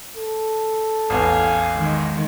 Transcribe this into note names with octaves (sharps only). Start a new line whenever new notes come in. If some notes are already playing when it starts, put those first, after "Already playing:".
A4
A1 E2 F5 G#5
D#3 G#3